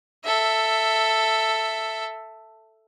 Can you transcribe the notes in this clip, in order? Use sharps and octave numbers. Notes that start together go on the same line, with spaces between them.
A4 E5